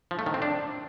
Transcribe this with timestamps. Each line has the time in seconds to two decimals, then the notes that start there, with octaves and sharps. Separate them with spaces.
0.11 F3
0.19 A3
0.26 D#3
0.34 C4
0.42 D4